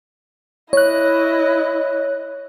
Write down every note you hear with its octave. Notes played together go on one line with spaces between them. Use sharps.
E4 C#5 D#5 F#6